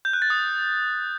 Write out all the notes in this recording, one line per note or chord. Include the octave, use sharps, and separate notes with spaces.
G6
F#6
A6
D#6